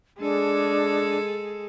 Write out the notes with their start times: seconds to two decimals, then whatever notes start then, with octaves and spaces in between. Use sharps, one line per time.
0.20 G#3 D4 G#4 A4